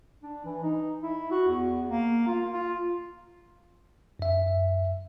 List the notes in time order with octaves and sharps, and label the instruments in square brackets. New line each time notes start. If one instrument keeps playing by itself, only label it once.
[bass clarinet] D4
E3
D#4
E4
F#4
E2
A#3
F4
F4
[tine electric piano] F#2 E5